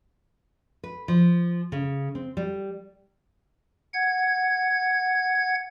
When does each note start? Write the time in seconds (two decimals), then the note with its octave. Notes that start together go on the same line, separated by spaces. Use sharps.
0.83 B4
1.08 F3
1.72 C#3
2.15 C4
2.37 G3
3.94 F#5 G#6